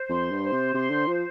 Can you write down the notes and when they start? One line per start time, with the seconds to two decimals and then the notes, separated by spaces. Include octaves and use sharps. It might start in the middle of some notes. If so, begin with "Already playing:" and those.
Already playing: C5
0.09 F2 C6
0.31 G2
0.42 C5
0.52 C3
0.74 C3 C6
0.90 D3
1.07 F3 C5